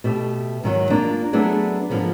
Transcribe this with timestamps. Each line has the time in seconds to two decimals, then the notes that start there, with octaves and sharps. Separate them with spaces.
0.04 B2 A3 G4
0.64 G#2 D#3 F#3
0.90 A#3 D4 F4
1.33 F#3 A3 B3 D4 G#4
1.90 G#2 D3 F3 A#3 B3